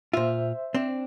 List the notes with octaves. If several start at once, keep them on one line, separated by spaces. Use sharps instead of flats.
A#2 F4 C5 E5
C4 D4